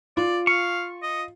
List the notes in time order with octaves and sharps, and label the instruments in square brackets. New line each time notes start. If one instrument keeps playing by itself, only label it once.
[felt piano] F4 [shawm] D5
[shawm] F5 [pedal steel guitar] C#6
[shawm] D#5